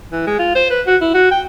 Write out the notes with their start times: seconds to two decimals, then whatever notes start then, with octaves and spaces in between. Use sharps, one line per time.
0.12 E3
0.27 G#3
0.39 F4
0.55 C5
0.70 B4
0.86 F#4
1.01 E4
1.14 F#4
1.31 G5